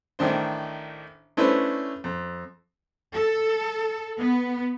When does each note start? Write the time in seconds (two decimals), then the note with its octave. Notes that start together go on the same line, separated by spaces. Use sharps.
0.19 A1 A2 D#3 D4 C5
1.37 A3 C#4 D4 E4 B4 C5
2.04 F2
3.12 A4
4.19 B3